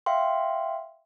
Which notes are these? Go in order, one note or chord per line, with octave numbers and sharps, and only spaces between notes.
E5 F5 G5 C6